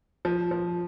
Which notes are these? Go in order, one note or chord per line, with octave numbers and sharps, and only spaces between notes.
F3
F3